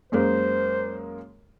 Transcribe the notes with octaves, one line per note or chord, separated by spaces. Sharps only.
F#2 G#3 A#3 C5